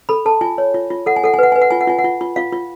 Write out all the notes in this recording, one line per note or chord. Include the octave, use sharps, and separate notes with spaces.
A4 B5
A4 A5
F4 G#5
C#5
F4
F4
A4 F#5
G#5
A4 F#5
G#5
B4 F#5
B4 G#5
F#5
F4 G#5
F#5
F4 G#5
F#5
F4
F4
F4 F5
F4